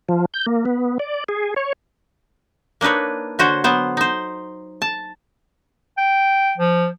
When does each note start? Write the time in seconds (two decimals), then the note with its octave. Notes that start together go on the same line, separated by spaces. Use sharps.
0.09 F3
0.34 G6
0.46 A#3
0.65 B3
0.99 D5
1.29 G#4
1.56 C#5
2.81 A#3 D4 D#4 B4 C#5
3.39 D3 F#4 C5 C#5
3.64 F#3 B3 C5
3.97 D#4 C5
4.82 A5
5.98 G5
6.58 F3